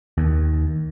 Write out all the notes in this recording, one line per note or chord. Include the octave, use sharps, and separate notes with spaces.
D#2